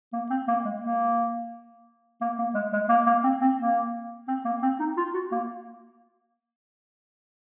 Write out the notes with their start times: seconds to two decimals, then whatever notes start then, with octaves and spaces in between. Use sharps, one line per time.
0.13 A#3
0.30 C4
0.48 A#3
0.65 G#3
0.82 A#3
2.21 A#3
2.38 A#3
2.54 G#3
2.73 G#3
2.89 A#3
3.06 A#3
3.24 C4
3.41 C4
3.58 A#3
4.28 C4
4.45 A#3
4.62 C4
4.80 D#4
4.97 F4
5.14 F#4
5.32 A#3